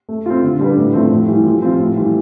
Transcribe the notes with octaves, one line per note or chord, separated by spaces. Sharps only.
A3
C4 F4
D3
G3 D4 G4 B4
A2
F3 A3 C4
A2
E3 G3
F3
C4 F4
A2
E3 G3